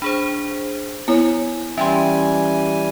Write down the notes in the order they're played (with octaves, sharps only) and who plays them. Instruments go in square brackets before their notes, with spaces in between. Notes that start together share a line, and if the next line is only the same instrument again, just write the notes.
[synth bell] D4 G#4 C5 [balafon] B5
[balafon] B3 E4 C#5 [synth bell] G#5
[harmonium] E3 G3 G#5 [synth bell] C#4 [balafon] E5 G5 C6